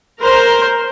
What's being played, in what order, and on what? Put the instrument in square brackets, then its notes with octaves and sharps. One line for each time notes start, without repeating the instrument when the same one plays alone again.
[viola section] A#4 C5